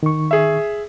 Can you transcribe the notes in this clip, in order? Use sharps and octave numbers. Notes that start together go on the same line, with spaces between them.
D#3 C#6
G#4 E5